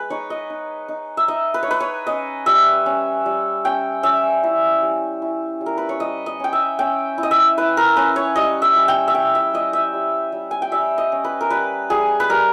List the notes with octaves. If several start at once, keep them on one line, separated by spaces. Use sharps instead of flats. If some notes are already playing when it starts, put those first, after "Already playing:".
Already playing: G#3 B4
D#4 C#5
D#5
D#4
D#4
E5
D#4 D#5
B4
C#5
D#4 B4
C#5
C#4 D#5
G3 E5
C#4
G3
C#4 G5
C#4 E5
E4
G3
E4
G3
A#4
B4
C#5
G3 D#5
D#5
C#4 G5
E5
C#4 G5
E4
D#5
E5
E4 B4
A#4
C#4 B4
C#5
G3 D#5
E5
G3
G5
E5
E4 G5
E5
G3 D#5
E5
G3
G3
G#5
G5
G3 E5
D#5
C#4
B4
A#4
G3 B4
G3 G#4
B4
G3 A#4